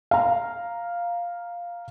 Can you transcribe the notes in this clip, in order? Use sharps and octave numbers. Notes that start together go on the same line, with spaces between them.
F5 A#5